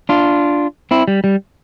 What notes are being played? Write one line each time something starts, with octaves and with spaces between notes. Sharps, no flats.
D4 F4
C4 E4
G3
G3